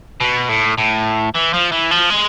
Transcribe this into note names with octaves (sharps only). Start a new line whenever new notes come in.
B2
A2
A2
E3
F3
E3
F3
G#3